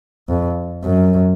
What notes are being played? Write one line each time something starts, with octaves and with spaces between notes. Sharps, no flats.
F2
F#2